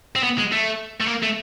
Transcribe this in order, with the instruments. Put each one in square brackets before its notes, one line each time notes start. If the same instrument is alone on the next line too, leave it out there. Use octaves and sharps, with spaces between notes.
[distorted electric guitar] C4
B3
G#3
A3
A3
A#3
A3